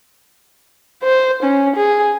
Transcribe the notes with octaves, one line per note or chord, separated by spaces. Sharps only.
C5
C#4
G#4